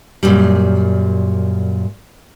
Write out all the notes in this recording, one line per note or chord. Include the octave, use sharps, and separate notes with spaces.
F#2 A#2 G3